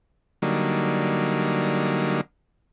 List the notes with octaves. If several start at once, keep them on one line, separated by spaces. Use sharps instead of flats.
D3 F#3 G3 A#3 D#4